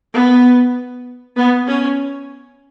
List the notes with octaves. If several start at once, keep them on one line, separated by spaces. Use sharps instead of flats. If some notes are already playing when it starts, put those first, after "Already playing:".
B3
B3
C#4